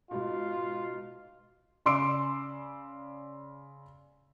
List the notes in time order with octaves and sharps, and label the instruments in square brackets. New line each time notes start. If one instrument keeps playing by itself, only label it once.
[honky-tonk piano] G#2 B2 [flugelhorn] F4
[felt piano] C#3 D5 C6 D6 E6 D7